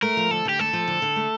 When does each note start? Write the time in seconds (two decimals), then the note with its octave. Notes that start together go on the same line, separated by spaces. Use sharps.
0.02 A3 A#4
0.17 F3
0.31 D3 A4
0.45 D3 G4
0.59 A3 A4
0.73 F3
0.87 D3
1.02 D3
1.16 A3